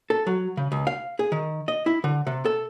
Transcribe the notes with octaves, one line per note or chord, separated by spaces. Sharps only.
A4
F#3
C#3
C#2
F5
G#4
D#3
D#5
E4
D3
C3
A4